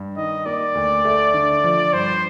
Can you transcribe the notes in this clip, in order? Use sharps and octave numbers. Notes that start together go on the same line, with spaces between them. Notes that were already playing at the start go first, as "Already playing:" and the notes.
Already playing: G2
D#3 D#5
A#3 D5
D2
A3
D3
F3
G2 C5